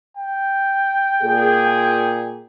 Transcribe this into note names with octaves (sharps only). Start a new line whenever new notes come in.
G5
A#2 G#4